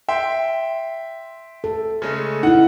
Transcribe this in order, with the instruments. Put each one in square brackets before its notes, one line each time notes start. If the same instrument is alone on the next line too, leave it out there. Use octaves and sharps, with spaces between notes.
[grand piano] E5 G5 C6
[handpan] A4
[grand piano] C#3 G#3 A3
[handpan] D#4 E4 [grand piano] F#5